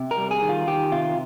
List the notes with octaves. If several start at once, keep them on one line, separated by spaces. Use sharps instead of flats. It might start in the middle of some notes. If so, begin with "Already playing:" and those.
Already playing: C3
A#4
G3
G#4
D#3
F4
D#3 G4
C3 F4